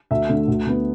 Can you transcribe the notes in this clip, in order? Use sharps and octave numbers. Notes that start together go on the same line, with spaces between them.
D2 E5
D3 A3
D2
D3 B3